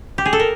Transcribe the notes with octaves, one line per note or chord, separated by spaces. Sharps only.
G4
G#4
A4
A#4